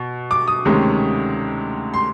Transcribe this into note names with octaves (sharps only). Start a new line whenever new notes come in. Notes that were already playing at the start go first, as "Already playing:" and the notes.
Already playing: B2
D6
D#6
D2 C3 D#3 G#3 C#4
C6